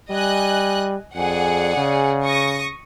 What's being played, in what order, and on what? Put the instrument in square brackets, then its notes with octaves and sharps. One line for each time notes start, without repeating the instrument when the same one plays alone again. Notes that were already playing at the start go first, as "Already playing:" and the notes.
[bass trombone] G3 [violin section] D#5 G#5 F#6
[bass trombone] F2 [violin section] G#4 D5 F#5
[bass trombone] C#3
[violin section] C#6 D#6 A#6